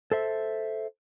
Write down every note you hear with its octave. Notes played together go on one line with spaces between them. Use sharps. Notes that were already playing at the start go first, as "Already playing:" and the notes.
A4 C5 E5